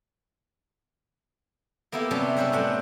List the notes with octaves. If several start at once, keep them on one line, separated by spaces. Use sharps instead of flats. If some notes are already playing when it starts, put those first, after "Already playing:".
A#3 B3 E4 G4 A4
C3 F#3 G3 B3 C#4 D4
C#4 B4 C5 E5 F#5
F#2 A2 G3 D4 F#5 G5